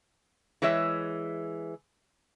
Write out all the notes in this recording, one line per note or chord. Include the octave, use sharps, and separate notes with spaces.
E3 G#3 G#4 C#5 E5